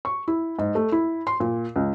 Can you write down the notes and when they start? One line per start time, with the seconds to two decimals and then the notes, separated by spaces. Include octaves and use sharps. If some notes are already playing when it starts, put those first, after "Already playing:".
0.05 C#6
0.28 E4
0.59 G#2
0.75 A3
0.92 E4
1.27 C6
1.40 A#2
1.76 C#2